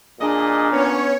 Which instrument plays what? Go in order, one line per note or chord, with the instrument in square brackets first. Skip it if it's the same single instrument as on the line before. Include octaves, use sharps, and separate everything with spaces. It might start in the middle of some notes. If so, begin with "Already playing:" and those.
[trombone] A#2 [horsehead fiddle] D4 [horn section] G#4 D#5
[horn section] B3 C#4 [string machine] C#5